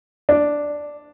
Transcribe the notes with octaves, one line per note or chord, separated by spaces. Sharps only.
D4